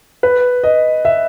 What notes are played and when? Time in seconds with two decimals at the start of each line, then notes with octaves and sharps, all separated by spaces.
0.23 B4
0.64 D#5
1.05 E5